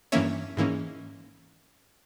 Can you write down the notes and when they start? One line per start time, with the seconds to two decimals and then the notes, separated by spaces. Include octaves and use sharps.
0.12 G2 E3 A#3 C#4 C#5 E5
0.57 G#2 E3 A#3 C#4